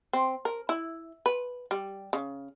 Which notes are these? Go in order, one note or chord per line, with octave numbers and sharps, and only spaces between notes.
C4
A#4
E4
B4
G3
C#3